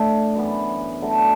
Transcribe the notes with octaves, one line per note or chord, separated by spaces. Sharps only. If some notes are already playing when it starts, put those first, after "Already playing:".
Already playing: A2 A3 D4
F#2 E3 B3
D3 F#3 A3